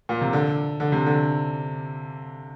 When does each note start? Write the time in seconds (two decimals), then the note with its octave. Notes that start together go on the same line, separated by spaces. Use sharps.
0.09 A#2
0.21 C3
0.33 D3
0.80 D3
0.92 C3
1.06 D3